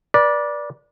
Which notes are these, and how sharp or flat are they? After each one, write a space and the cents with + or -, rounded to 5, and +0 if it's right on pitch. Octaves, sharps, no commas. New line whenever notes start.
B4 -40 D5 +0